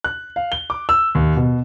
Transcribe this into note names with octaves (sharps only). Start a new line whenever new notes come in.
F#6
F5
G7
D6
E6
D#2
B2